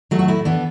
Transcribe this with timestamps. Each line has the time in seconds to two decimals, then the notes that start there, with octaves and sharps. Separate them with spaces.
0.11 F#3 A3
0.19 F#4
0.28 A2 E4
0.45 E3 B3 D4